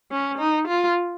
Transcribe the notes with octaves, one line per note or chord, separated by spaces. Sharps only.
C#4
D#4
F4